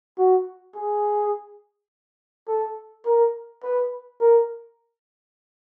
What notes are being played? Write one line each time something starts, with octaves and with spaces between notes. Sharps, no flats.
F#4
G#4
A4
A#4
B4
A#4